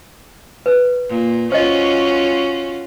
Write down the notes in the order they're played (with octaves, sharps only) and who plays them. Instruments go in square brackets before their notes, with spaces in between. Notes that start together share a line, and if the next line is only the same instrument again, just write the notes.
[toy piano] B4
[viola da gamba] A#2
[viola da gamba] C#4 F4 F#4 [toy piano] C5 D#5